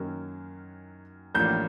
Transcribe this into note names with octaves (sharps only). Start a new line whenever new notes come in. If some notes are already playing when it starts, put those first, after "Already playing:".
Already playing: F#2 D#3 F#3 A#3 C#4
A1 A2 F3 A#3 D4 G6